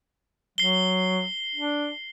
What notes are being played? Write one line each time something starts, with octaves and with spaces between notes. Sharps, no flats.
F#3 C7 G7
D4